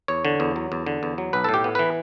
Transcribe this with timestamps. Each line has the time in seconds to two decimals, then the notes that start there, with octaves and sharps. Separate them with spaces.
0.08 E2 C#5
0.25 D3
0.40 E2
0.56 F#3
0.72 E2
0.86 D3
1.03 E2
1.18 F#3
1.33 B1 B4
1.44 A2 A4
1.54 G4
1.64 B3
1.75 E3 B4